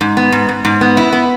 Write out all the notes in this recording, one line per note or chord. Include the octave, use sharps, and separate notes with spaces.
G#2
B3
G#2
G#2
G#2
B3
E4
B3